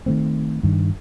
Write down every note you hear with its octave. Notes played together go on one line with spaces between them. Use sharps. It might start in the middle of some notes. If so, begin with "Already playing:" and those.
D#3 A3 C4
G2 D#3